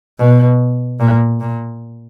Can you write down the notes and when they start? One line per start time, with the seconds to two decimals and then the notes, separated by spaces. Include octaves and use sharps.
0.19 B2
1.00 A#2
1.40 A#2